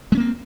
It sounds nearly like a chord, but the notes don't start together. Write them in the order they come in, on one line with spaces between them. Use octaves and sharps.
G#3 C#4 A#3 C4